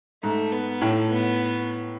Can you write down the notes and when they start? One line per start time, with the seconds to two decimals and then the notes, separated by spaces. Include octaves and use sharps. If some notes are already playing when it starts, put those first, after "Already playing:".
0.23 G#2 A3
0.52 B3
0.82 A2 A3
1.10 B3